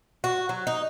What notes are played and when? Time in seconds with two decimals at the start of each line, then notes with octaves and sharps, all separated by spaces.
0.24 F#4
0.49 F#3
0.67 D#4